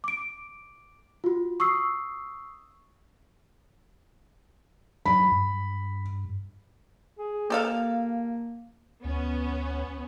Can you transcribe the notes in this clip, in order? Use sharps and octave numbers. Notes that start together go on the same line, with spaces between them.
D6 D7
F4 F#4
C#6 D#6 E6 C7
F#3 B5
G2
G#4
A#3 G4 A4 F5
D2 B3 C#4